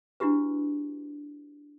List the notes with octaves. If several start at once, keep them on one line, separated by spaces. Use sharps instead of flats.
D4 E4 F#4 G4 B4